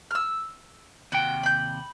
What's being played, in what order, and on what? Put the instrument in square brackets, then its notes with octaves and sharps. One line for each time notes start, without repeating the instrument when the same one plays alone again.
[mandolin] E6 F6
[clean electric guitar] D#2 C3 G5 [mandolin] F#4
[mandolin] B5 G6